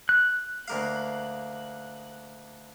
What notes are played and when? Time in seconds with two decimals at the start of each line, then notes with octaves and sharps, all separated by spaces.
0.09 F#6
0.68 D2 A#3 F5